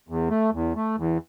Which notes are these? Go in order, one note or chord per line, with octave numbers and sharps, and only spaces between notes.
E2
A3
E2
A3
E2